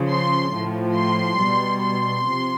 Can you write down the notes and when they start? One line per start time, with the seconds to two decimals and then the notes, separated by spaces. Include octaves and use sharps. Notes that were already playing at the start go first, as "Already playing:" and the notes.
Already playing: C#3 F3
0.08 C6
0.51 A2 F3
0.94 C6
1.38 B2 G3
1.82 C6
2.26 C3 F3